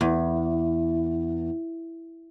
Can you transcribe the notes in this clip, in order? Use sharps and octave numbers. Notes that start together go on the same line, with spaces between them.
E2